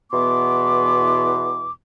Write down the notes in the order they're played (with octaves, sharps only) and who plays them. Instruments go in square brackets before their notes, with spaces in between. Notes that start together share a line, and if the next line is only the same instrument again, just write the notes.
[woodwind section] E2 B2 E3 B3 C6 D6